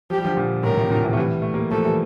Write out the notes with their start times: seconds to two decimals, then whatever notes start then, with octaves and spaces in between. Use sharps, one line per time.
0.10 F3 G4
0.18 G3
0.25 D3 F3
0.37 A#2 D3
0.63 A2 C3 A#4
0.71 A#2
0.77 A2 C3
0.90 A#2 D3
1.04 C3 E3
1.13 A3
1.17 E3 G3
1.42 A3
1.54 G3 A#3
1.71 F3 A3 A4
1.85 E3 G3